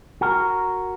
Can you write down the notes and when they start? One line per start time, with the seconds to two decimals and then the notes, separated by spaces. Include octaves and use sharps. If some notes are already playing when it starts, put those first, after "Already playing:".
0.21 F#4 A#4